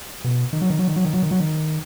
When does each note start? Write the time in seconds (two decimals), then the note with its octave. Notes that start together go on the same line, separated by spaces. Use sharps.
0.24 B2
0.53 D#3
0.62 F#3
0.70 D#3
0.79 F#3
0.88 D#3
0.96 F#3
1.05 D#3
1.14 F#3
1.23 D#3
1.31 F#3
1.40 D#3